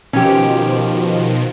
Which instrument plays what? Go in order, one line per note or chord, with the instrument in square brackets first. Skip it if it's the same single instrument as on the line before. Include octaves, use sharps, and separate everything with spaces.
[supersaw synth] B2 D#3 F3 [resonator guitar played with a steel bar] C#4 G4